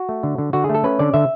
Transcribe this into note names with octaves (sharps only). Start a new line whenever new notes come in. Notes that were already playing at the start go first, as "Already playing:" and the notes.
Already playing: F#4
A3
D3
D3
D3 F#4
G#4
A3
A4
C#4 B4
D3 D5
D3 E5